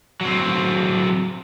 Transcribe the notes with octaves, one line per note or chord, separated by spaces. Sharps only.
F#3 C4